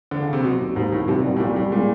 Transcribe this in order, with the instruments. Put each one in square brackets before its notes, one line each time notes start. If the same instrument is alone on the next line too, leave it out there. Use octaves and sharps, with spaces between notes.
[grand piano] D3
C#3
C3
[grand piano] B2 [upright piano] F#3
[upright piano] D#2
[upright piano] D#2 [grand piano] G#2
[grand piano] A2 [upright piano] D#3
[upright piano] C2 [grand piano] C3
[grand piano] B2 [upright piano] G3
[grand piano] A2
[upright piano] C2 [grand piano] A#2
[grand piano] A2 [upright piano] G3
[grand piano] A#2 [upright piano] G#3